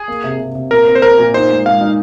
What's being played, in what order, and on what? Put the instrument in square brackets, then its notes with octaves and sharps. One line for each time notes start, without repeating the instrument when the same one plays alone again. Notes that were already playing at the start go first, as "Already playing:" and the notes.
Already playing: [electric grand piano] G#4
[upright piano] A#3
C3
C3
C3
[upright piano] A#2 [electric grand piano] A#4
[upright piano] C4
[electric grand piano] C5
[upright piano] C4 [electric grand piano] A#4
[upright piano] A#2
[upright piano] D#4 [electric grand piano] C5
[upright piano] G#3
[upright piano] G#3 [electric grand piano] F5
[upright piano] D#4